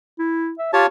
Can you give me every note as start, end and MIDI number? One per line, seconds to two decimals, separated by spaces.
0.19 0.53 64
0.59 0.68 76
0.73 0.86 65
0.73 0.86 67
0.73 0.86 73
0.73 0.86 81